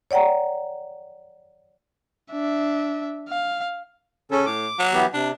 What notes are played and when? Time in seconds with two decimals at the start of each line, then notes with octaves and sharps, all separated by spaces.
0.11 C#5 D5 F#5 G5 A#5
2.31 D4 E5
3.29 F5
4.31 C#3 C#4 A4
4.46 A2 D6
4.79 F#3
4.93 E3 B3 G4
5.14 C3 D4